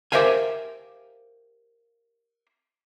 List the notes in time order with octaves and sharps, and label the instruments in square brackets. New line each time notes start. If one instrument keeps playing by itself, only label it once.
[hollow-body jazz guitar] G4 A#4 C5 E5 F5 G#5